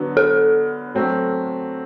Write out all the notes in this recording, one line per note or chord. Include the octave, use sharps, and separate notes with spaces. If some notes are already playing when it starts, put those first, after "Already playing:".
Already playing: D3 F#3 B3
A4
F#3 A3 C4